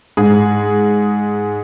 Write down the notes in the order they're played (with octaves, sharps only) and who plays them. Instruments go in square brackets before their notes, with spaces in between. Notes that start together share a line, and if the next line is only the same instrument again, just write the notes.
[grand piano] G#2 [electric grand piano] G#4